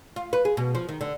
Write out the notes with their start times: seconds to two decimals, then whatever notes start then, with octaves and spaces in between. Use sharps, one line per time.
0.16 F4
0.33 B4
0.45 G#4
0.57 B2
0.75 F3
0.89 D#3
1.01 D3